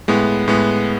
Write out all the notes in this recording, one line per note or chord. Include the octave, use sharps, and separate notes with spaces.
A2 G#3 B3
A2 G#3 B3